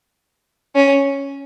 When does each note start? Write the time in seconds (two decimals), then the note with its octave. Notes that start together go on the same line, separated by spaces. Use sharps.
0.75 C#4